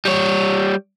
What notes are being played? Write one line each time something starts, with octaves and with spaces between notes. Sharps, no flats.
G3 C#5